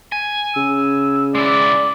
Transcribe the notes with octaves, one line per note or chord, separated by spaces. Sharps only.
G#5
C#3 E6
G#3 E4 D5